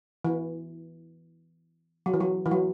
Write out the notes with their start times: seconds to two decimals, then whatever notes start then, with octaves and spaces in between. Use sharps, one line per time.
0.25 E3
2.06 F#3
2.14 E3
2.20 F#3
2.46 E3
2.51 F#3